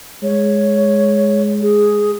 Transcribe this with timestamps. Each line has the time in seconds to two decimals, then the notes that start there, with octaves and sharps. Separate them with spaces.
0.23 G#3 C#5
1.62 G#4